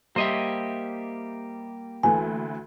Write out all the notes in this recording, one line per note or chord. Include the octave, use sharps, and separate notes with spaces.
G3 A#3 G4 C5 D#5 E5
D2 E3 A3 G#5